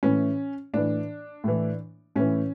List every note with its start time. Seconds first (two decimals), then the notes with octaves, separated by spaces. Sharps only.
0.03 A2 E3 C#4
0.74 A2 E3 D4
1.44 A2 E3
2.16 A2 E3 C#4